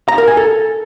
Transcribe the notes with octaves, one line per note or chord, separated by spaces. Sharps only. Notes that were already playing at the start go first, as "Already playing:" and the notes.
A#5
A#4
G#5
A4